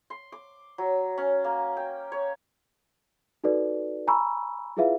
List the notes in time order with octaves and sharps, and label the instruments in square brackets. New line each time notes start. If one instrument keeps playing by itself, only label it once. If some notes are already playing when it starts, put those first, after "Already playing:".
[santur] C6
D6
F#3
C#4
A#3
G5
C#5
[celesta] D#4 F#4 A4 B4 D5
G#5 A#5 B5 C#6 E6
E4 F4 G#4 B4 E5 F5